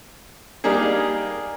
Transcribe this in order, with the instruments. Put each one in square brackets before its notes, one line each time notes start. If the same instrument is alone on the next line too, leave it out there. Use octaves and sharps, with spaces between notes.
[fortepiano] G3 A#3 D4 D#4 G#4